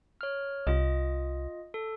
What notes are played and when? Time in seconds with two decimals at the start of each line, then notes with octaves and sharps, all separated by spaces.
0.21 C#5 F6
0.67 C2 F4 D#5
1.74 A4